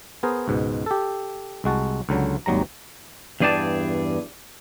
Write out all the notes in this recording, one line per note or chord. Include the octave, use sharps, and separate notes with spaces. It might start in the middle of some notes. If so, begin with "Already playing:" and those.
B3 G#4 A#4 C5
C#2 G#2 B2
G4 A4
C2 G#3 F#4 A5
C#2 D3 F#3
G#1 D#2 F#3 G3 A#5
E2 G2 G#4 D5 G5 A5